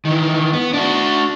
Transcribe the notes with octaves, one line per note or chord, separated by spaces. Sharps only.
D#3 E3
B3
D4 F#4